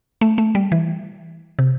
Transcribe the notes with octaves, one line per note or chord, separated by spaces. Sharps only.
A3
A3
G3
E3
C3